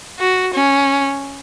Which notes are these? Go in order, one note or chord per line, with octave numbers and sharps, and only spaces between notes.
F#4
C#4